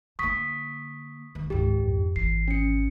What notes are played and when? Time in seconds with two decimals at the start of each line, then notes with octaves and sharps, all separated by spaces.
0.19 D3 A#3 C#6 D#6 B6
1.35 D#2
1.50 G#1 C#2 G4
1.85 F2
2.16 G#1 E3 C7
2.48 C#4 C#7